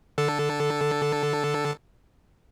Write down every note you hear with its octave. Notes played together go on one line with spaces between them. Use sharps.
D3 A4